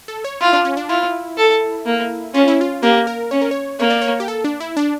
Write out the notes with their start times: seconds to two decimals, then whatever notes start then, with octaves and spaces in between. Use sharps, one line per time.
0.08 A4
0.24 C#5
0.41 E4 F4
0.53 D4
0.65 C#4
0.77 D4
0.89 E4 F4
1.37 A4
1.86 A#3
2.34 C#4 F4
2.48 E4
2.61 F4
2.83 A#3 G4
3.07 A#4
3.31 C#4 C#5
3.41 A#4
3.51 C#5
3.79 A#3 C#5
3.90 D5
4.02 C#5
4.20 G4
4.28 A4
4.44 D4
4.60 E4
4.77 D4